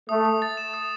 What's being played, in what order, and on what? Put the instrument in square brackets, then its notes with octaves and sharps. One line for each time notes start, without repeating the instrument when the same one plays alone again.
[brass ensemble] A3 [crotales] D#6
[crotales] D#6
A6
E7
D#6